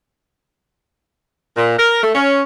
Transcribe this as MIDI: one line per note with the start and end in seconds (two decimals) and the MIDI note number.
1.57 1.77 46
1.78 2.00 70
2.02 2.11 57
2.14 2.43 61